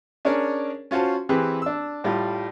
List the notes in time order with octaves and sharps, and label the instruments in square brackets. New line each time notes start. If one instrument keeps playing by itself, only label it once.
[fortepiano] C#4 D4 G#4 A#4 C#5 D5
C#4 F4 F#4 C5 A5
E3 C4 G4 G#4 B4
D4 E6
A2 G3 F4